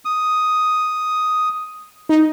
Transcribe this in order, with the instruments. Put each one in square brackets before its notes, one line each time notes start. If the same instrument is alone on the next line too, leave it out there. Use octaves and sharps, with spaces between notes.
[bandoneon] D#6
[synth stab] D#4